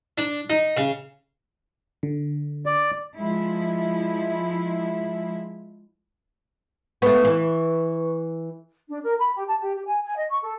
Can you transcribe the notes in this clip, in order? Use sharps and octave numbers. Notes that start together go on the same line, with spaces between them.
D4
D#4
C#3
D3
D5
F3 G#3 E4
A3 B3 B4 C#6
E3
D4
A#4
B5
G4
A5
G4
G4
G#5
G#5
D#5
C#6
A4